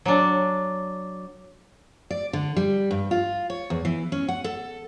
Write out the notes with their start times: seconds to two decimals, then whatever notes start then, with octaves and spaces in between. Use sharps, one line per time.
0.05 F#3 D4
2.11 D5
2.33 D3
2.57 G3
2.91 G2
3.11 F4
3.50 C#5
3.70 E2
3.85 E3
4.12 C#4
4.28 F#5
4.44 A4